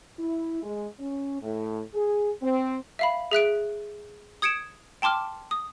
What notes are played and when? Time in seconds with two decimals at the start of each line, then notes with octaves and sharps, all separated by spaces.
0.18 E4
0.62 G#3
0.98 C#4
1.41 A2
1.94 G#4
2.41 C4
2.99 E5 F5 B5
3.31 G#4 E5 F#6 D7
4.42 D#6 G#6 C#7 D7 E7
5.02 G5 A5 C6 D6 F6
5.51 D#6